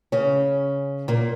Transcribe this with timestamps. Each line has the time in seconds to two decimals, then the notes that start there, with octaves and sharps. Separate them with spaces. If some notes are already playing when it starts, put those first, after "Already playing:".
0.12 C#3 C#4
1.08 A#2 A#3